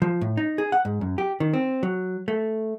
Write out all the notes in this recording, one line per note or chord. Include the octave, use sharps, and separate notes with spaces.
F3
A2
D#4
G#4
F#5
G#2
F#2
G4
D#3
C4
F#3
A3